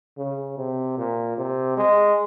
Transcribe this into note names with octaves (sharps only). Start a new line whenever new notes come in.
C#3
C3
A#2
C3
G#3